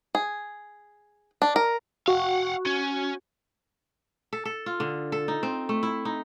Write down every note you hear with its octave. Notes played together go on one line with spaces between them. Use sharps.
G#4
D4
A#4
F#4 F5 F#5
C#4
A4
A4
F4
D3
A4
D#4
C4
A3
E4
D#4